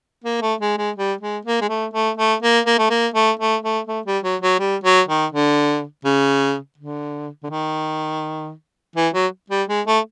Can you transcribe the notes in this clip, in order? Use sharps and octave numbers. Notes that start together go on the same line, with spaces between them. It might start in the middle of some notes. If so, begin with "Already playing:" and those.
A#3
A3
G#3
G#3
G3
G#3
A#3
G#3
A3
A3
A3
A#3
A#3
A3
A#3
A3
A3
A3
A3
G3
F#3
F#3
G3
F#3
D#3
D3
C#3
D3
D3
D#3
E3
F#3
G3
G#3
A3